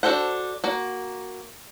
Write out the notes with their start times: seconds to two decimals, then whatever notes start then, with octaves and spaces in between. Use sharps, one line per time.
0.03 D4 F#4 A4 C5 F#5
0.64 A#3 F#4